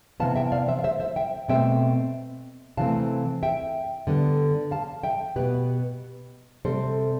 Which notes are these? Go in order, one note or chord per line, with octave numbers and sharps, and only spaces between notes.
C3 E3 B3 F5 A5
E5 G5
D5 F5
C5 E5
F5
C5 E5
C5 E5
E5 G5
B2 A3 C4 E5 G5
C3 E3 A3 C4 F5 A5
E5 G5
D3 G3 B3
F5 A5
E5 G5
B2 B3 G4 B4
C3 G3 C4 A4 C5